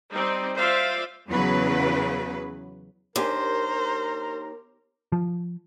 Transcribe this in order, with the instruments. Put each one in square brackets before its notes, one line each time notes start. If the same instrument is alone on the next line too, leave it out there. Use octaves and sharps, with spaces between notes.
[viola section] G3 C4 D#4 D5
F4 C5 D5 E5 F5
[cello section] E2 C#3 E3 F#3 B4
[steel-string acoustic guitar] D#2 [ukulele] D4 G4 G#5 [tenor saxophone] A#4 [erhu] C5
[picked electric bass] F3